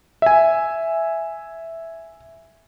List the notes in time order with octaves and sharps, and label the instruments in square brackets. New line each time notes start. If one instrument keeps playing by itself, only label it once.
[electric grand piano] E5 G#5